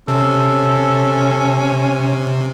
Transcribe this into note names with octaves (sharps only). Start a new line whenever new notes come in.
C3 C#4 A4